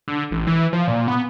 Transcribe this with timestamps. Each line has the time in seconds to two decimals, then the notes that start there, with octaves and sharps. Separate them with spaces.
0.08 D3
0.31 A1
0.47 E3
0.73 F3
0.88 A#2
1.08 B3